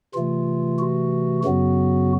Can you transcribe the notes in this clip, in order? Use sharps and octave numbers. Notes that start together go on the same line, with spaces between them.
C3 E3 A3 F4
F#4
F#2 C#3 F#3 B3 F#4